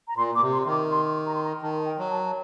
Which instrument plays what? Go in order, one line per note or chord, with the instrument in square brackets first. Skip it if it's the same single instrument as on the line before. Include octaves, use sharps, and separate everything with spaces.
[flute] A#5
[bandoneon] A#2 [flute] C6
[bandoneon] A#2 [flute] D6
[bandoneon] C3
[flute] C6
[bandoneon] D#3 [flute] C6
[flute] D6
C6
A#5
C6
A#5
[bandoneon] D#3 [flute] A5
[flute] G5
[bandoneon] F#3
[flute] A5